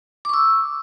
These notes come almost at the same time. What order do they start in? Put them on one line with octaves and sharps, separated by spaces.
D6 C#6 E6